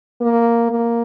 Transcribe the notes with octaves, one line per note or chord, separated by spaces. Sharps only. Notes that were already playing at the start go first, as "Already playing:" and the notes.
A#3
A#3